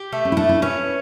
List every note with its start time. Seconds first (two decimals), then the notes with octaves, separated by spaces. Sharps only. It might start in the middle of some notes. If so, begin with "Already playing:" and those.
Already playing: G4
0.12 A3
0.25 C#4
0.32 E4
0.37 A3 D4
0.49 E4
0.62 C#4 B4